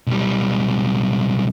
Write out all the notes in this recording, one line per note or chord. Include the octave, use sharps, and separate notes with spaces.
B1 G3